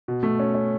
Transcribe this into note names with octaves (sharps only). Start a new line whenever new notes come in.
B2
A3
C#4
C#4